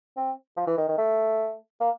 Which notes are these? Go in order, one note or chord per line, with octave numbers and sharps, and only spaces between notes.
C4
F3
E3
D#3
D#3
A3
A#3